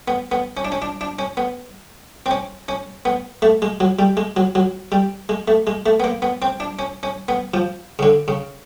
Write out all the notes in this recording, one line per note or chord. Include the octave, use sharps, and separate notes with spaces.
B3
B3
C#4
D4
C#4
D4
D4
C#4
B3
C4
C#4
C#4
B3
A3
G#3
F#3
G3
G#3
F#3
F#3
G3
G#3
A3
G#3
A3
B3
A#3
B3
C4
D4
C#4
C#4
B3
F3
C#3
D3
C#3